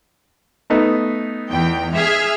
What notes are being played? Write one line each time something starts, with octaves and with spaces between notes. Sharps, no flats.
A3 B3 D#4
E2 G5
G#4 E5 F6